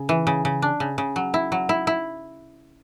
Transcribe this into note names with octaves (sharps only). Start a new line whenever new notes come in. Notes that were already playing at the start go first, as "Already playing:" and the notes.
Already playing: C#3
E3
C#3
C#3
D4
C#3
C#3
F#3
E4
F#3
E4
E4